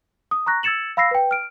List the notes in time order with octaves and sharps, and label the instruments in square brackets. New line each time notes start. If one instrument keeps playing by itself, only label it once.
[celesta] D#6
A#5 C#6 F#6 A#6
E6 G#6 A6 C#7 E7 F#7
F5 B5 E6 A#6 C7
B4 G5
F6 D7